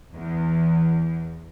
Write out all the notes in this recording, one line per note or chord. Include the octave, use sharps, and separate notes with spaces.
E2